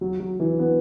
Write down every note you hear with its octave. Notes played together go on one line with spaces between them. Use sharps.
F#3
F#3
E3
B3